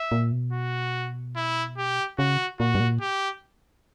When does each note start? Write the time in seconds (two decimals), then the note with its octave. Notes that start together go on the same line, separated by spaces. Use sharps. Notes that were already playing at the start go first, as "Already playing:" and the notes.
Already playing: E5
0.12 A#2
0.32 B2
0.53 F#4
1.36 E4
1.78 G4
2.19 C#3 F#4
2.60 A#2 F#4
2.75 G2
2.80 A#2
3.01 G4